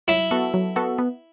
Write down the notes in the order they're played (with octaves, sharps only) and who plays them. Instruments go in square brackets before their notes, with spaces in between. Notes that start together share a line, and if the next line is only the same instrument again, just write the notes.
[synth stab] F#3 [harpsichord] E4
[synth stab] B3 F#4 A4
F#3
B3 F#4 A4
B3